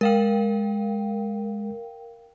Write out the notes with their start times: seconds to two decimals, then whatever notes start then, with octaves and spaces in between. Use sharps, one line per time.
0.01 G#3 A#4 F5 G5